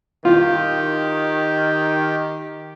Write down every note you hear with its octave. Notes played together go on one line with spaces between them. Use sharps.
D#3 F4 G4